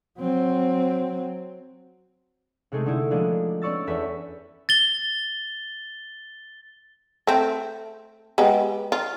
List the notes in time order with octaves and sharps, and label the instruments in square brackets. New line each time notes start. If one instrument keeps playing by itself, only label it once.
[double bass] F#3 C4
[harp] C3 G#3 A3 D#4 G#4
D3 D#4 E4
F3 G#3 A#3 D4 D#5
B3 C#4 D5 C#6 E6 A6
E2 A4 B4 E5 B6
[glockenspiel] A6 G7
[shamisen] A3 C4
G#3 B3 G4
F4